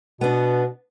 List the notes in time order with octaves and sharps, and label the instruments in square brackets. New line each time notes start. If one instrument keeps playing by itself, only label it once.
[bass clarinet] B2 [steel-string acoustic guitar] B3 D4